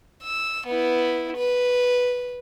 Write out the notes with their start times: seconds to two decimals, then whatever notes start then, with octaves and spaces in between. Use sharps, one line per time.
0.23 E6
0.67 B3 E4
1.37 B4